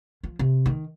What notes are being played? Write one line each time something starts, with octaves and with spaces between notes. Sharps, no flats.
F3
C3
D#3